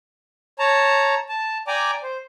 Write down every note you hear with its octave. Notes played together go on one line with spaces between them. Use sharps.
C#5 A5 A#5
A5
D5 G5 G#5 A#5 D6
C5